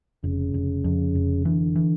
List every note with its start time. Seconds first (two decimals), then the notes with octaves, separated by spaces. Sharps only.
0.24 F1 C#3
0.54 F1
0.84 F2
1.15 F1
1.45 D3 E3
1.76 E3